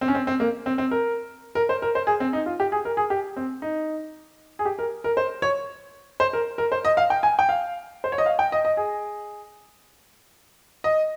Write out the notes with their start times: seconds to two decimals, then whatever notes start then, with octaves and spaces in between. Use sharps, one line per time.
0.01 C4
0.08 C#4
0.15 C4
0.27 C4
0.40 A#3
0.66 C4
0.78 C4
0.91 A#4
1.55 A#4
1.69 C5
1.82 A#4
1.95 C5
2.07 G#4
2.20 C4
2.33 D#4
2.46 F4
2.60 G4
2.72 G#4
2.85 A#4
2.97 G#4
3.10 G4
3.36 C4
3.62 D#4
4.59 G#4
4.65 G4
4.79 A#4
5.04 A#4
5.17 C5
5.42 C#5
6.20 C5
6.33 A#4
6.58 A#4
6.72 C5
6.85 D#5
6.97 F5
7.10 G5
7.23 G#5
7.39 G5
7.49 F5
8.04 C5
8.12 C#5
8.18 D#5
8.26 F5
8.39 G5
8.52 D#5
8.65 D#5
8.77 G#4
10.84 D#5